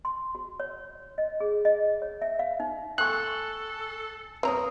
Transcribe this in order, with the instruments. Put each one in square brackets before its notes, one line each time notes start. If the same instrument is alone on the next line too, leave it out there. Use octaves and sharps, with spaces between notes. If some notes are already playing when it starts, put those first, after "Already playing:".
[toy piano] C6
F#4
C#5
D#5
G#4
D#5
C#5
E5
F5
D#4
[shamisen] A3 [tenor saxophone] A4 [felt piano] G5 G#5 C#6 [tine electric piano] F#6
[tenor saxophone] A#3 [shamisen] C4 A#5 [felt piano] B4 C#5 D#6